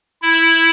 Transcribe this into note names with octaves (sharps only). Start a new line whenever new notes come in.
E4